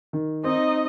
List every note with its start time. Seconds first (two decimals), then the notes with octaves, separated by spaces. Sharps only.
0.13 D#3
0.44 C4 D#4 D#5